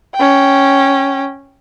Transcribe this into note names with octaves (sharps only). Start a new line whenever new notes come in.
C#4 G5